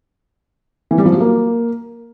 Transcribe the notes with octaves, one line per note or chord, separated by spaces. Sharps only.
E3
G3
F3
F#3
A#3